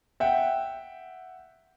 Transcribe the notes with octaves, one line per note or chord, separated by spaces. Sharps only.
E5 F#5 G5